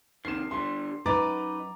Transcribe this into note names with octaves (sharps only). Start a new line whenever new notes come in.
C3 D#3 C7 E7
D3 G3 C6
F#2 D#4 B4 A#5 D6 A6